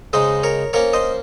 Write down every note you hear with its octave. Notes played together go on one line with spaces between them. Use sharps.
C#3 G#3 D#4 C5 D#5
A#4 C#5
F3 A#3 C#4 A#4 C#5
C5 D#5